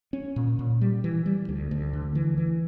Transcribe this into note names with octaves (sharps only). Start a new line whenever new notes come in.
C#4
A#2
A#2
G3
E3
G3
D2
D2
D3
E3
E3